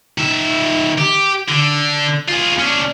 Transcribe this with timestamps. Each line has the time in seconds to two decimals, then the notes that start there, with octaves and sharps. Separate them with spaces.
0.18 D#3 E5
0.98 G4
1.49 D3
2.29 F4 G#4
2.59 C#4 D4